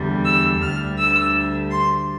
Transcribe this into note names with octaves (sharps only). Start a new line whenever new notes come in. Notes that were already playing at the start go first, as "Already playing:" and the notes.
Already playing: E2 D3 G3
E6
D2 D3 G3 F6
E6
C6